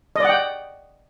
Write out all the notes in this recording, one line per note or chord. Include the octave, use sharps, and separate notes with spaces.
D5 D#5 F#5 G5